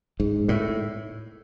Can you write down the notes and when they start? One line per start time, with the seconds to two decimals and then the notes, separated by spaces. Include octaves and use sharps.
0.20 G#2
0.48 A2